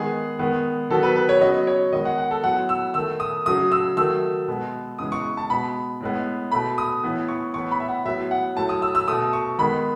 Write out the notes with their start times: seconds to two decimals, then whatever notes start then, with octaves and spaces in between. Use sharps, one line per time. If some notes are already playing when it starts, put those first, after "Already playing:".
Already playing: D#3 G#3 B3 G#4
0.39 D#3 G#3 B3
0.90 D#3 F#3 B3 A4
1.03 B4
1.16 B4
1.29 C#5
1.41 C#3 F#3 B3 D#5
1.67 C#5
1.92 D#3 G#3 B3 D#5
2.05 F#5
2.18 F#5
2.31 A4
2.43 A2 F#3 B3 F#5
2.69 E6
2.94 D#3 A3 E6
3.20 D#6
3.46 C#3 F#3 A3 D#6
3.72 E6
3.97 D#3 F#3 A3 E6
4.48 B2 G#3 B3
4.99 C#3 E3 G#3 B3 D#6
5.12 C#6
5.37 A5
5.50 B2 G#3 B3 B5
6.01 A2 G#3 B3
6.52 B2 A3 B5
6.78 D#6
7.03 A2 E3 B3
7.28 C#6
7.54 A2 E3 B3 C#6
7.71 B5
7.80 E5
7.89 F#5
8.05 A2 F#3 B3 E5
8.31 F#5
8.57 A2 F#3 A3 A5
8.69 D#6
8.82 E6
8.95 E6
9.08 B2 A3 D#6
9.33 C#6
9.58 D#3 G#3 B3 B5